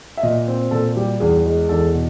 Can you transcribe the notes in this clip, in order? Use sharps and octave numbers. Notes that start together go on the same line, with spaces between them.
E5
A#2 D#5
C4
A#2 A4
G3 G4
E2 G#4
G#3
E2 A4
B2